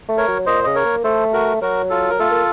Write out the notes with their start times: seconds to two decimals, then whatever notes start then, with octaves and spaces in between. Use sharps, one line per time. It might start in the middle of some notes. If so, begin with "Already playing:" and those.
0.09 A3
0.18 A#4 C#5
0.28 F#3
0.46 A#2 C5 D#5
0.64 C#3 D#5
0.75 A#4 C#5
0.85 A#3
1.04 A3 A4 C5
1.33 F#4 A#4
1.62 F#3 F#4 A#4
1.90 F4 A4
2.10 A#4
2.19 A3 F4 A4
2.31 A#3